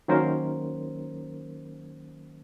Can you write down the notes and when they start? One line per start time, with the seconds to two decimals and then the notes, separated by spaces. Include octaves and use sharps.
0.08 D#3 F#3 A#3 C#4 A#4 C5